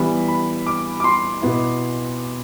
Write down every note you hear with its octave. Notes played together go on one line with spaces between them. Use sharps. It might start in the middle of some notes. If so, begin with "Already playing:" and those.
Already playing: E3 G3 B3 B5
B5
D6
D6
C6
B2 B3 E4